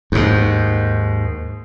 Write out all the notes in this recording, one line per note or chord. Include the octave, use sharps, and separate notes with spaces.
D#2 G#2